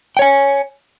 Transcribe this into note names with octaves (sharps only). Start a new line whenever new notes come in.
C#5 G5 G#5